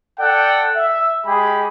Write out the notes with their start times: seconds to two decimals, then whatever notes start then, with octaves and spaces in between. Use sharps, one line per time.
0.20 A4 D5 F#5 G5
0.76 E5
1.26 G#3 G4 G#4 B5